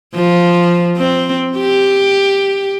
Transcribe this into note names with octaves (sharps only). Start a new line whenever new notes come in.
F3
C4
G4